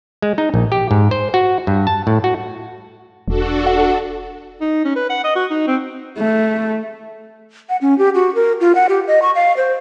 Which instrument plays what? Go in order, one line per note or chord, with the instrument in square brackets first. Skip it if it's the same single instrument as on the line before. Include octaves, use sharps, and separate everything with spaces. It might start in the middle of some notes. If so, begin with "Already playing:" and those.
[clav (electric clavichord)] G#3
D#4
A#1
G4
G#2
C5
F#4
G2
A5
A2
F#4
[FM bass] E1 [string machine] D4 F#4 A4
[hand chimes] F#5
[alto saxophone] D#4
C#4
B4
F#5
D#5
F#4
D#4
C4
[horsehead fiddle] A3
[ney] F#5
C#4
G4
F#4
A#4
F4
F#5
G4
D#5
C#6
F5
C5